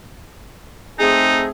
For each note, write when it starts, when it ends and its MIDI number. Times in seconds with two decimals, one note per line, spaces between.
0.99 1.49 57
0.99 1.49 60
0.99 1.43 63
0.99 1.49 68